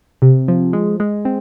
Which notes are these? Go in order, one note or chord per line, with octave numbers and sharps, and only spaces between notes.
C3
F3
G#3
G#3
C4